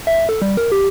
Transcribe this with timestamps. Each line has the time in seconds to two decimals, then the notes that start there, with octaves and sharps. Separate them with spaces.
0.07 E5
0.29 A4
0.42 G3
0.57 A#4
0.72 G4